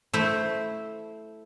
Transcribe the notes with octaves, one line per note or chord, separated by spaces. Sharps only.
A3 E4 C5